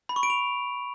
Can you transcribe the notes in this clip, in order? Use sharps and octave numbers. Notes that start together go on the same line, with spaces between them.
B5
C#6
D7
F7